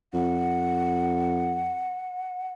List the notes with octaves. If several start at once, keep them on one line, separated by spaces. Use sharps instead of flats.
F2 F#5